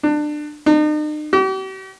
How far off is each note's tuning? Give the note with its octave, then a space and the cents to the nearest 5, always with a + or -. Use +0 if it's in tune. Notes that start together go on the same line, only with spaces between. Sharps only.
D4 +25
D#4 -45
G4 -45